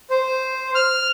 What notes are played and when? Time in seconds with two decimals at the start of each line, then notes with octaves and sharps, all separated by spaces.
0.10 C5
0.75 F6